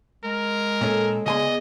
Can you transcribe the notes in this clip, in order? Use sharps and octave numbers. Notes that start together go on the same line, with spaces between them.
G#3 A#4
A#2 C#4 A4
C#3 B3 G#4 D5 D#5 G#5 C6